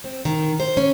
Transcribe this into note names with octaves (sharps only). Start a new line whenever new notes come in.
C4
D#3
C5
C#4